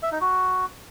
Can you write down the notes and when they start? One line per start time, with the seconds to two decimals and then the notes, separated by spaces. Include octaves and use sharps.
0.03 E5
0.12 D#4
0.21 F#4